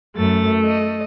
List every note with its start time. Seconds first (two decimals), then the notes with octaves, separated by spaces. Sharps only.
0.16 F#2 A3 A6
0.65 D#5